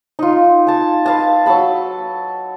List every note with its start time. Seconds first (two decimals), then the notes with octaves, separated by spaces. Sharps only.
0.19 D#4 F4
0.67 G#5 A5
1.06 B4 F5 A5
1.46 F#3 A4 A5 B5